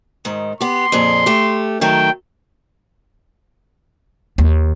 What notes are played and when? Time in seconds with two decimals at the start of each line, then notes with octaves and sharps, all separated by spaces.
0.25 G#2 D#3
0.61 B3 G4 C6
0.92 F2 A#2 G#4
1.26 A3 G4
1.81 D#3 F#3 A3 G5
4.38 D#2